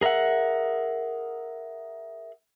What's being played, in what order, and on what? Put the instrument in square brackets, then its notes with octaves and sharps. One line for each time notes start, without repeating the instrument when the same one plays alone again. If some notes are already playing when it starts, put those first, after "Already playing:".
[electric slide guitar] G#4 A#4 D#5 E5 F#5